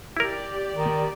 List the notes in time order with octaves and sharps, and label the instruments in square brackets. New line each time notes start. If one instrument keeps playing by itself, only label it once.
[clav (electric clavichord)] E4 A#4 [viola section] G4 D5
[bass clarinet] D#3